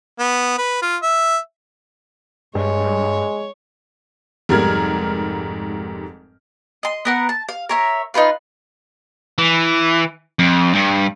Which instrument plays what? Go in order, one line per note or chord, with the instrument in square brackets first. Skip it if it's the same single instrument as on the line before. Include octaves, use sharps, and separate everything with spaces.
[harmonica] B3
B4
F4
E5
[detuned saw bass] G2 [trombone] G#3 [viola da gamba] C#5
[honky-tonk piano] F1 G#2 G3 A#4 F6 G#6
[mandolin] D#5 C6
B3 A#4 F#5
A5
F5
A#4 C#5 E5
D#4 F4 B4 F5
[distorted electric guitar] E3
F2
G2